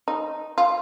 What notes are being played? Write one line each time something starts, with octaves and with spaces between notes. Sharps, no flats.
D#4
F4